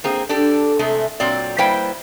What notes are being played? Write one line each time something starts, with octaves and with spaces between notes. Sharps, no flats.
A#3 C4 G#4
D4 G4 A4
C3 G#3 A3
A#2 F#3 C4 D5
G3 A#3 E4 B4 C5 G5